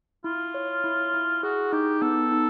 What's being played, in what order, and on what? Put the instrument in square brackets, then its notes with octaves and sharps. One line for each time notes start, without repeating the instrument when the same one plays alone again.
[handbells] E4 [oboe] F4
[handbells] C#5
E4
E4
[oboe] F#4 [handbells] G#4
[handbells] D#4 [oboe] G4
[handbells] B3 [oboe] A4
[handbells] D#4